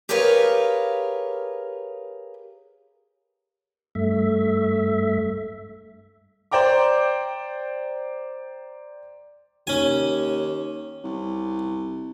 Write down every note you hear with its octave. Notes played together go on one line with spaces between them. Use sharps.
G4 G#4 A#4 B4 C#5 F5
G2 A3 E5
C5 D5 G5 A#5 D6
D#2 C#4 G#5
C2